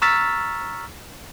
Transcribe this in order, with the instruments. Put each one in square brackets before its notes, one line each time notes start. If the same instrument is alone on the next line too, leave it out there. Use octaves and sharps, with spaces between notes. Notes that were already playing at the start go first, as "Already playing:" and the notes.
[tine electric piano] A#5 C#6 E6 F6 A6 B6